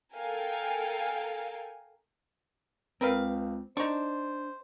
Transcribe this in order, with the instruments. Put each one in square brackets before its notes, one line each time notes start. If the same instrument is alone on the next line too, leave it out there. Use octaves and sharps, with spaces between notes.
[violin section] A4 A#4 F5 G5 G#5
[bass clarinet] C#2 [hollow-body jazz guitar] C4 [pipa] A#4 B4 F5
[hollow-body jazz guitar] D4 [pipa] D#4 C#6 [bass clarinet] C5